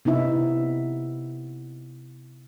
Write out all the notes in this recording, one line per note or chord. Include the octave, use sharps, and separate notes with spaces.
C3 B3 D#4 E4 E5